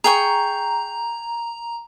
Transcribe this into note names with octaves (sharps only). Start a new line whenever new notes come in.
G#4 G5 A#5 C#6